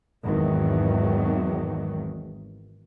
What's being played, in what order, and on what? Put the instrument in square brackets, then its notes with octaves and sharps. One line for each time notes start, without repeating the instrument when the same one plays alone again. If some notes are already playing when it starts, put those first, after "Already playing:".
[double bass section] G#1 E2 D#3 F#3